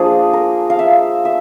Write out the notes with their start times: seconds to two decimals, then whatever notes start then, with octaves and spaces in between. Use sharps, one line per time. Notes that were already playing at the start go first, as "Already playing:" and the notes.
Already playing: F3 A#3 D4 G#4
0.33 A#4
0.70 F5
0.79 E5
1.25 E5